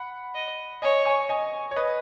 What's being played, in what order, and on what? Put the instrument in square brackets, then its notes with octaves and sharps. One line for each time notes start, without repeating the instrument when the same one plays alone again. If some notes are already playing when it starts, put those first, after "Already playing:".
Already playing: [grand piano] F#5 B5
[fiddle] D#5
[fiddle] C#5 [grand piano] D#5 G#5
[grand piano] G#5 C#6
D#5 G#5
C#5
B4 D#5